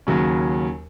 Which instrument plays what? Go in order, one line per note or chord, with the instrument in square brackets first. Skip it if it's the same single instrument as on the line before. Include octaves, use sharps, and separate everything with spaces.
[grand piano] D#2 C#3 F#3 C#4